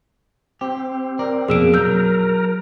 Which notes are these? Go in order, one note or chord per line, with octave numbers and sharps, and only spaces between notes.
C4 G4
A#4 D5
F2 B2 A#3 G#4 E6 D7
F#3 A#4 E6 G6